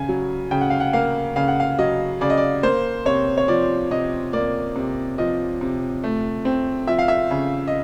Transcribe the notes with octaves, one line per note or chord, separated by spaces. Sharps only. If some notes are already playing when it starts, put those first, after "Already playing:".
Already playing: C#3 G#5
F#3
C#3 G5
F#5
F5
F#5
A#3 F5
C#3 F5
F#5
F5
F#3 D#5
C#3 D5
D#5
D5
A#3 C5
C3 C#5
C#5
F3 D5
C3 D#5
A#3 D5
C3
F3 D#5
C3
A3
C4
F3 E5
F5
E5
C#3
D#5